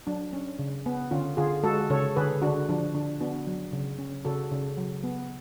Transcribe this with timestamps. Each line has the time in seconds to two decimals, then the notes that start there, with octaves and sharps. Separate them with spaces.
0.07 F#3 D4
0.33 C#4
0.59 C#3
0.86 B3
1.11 D3 C#4 F4
1.37 D3 F4 G#4
1.63 G#3 F#4 A4
1.90 C#3 A4 C#5
2.16 D3 G#4 B4
2.42 D3 D4 F#4
2.69 F3 D4
2.95 D3 D4
3.21 B3 D4 F#4
3.47 F#3
3.73 C#3
3.98 C#4
4.25 C#3 F#4 A4
4.52 C#3
4.77 F#3
5.04 B3